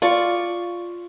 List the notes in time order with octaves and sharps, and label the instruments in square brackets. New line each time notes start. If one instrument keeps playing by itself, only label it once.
[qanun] F4 D5 C#6